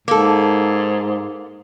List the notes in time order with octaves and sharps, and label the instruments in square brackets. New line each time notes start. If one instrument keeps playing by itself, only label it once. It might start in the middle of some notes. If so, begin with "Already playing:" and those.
[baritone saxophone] G#2 [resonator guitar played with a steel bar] A#3 A4